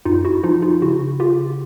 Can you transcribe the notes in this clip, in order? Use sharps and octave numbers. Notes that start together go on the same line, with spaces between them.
F#2 D#4 F4
E4 F#4
F3 D#4 F4
D#4 F4
C#3 E4 F#4
C#3 F4 G4